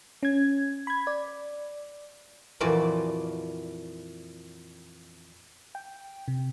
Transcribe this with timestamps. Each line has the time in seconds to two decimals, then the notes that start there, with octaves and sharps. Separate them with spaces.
0.23 C#4 G#6
0.87 B5 G#6
1.07 D5
2.60 F2 A#2 E3 F#4 D5
5.75 G5
6.28 C3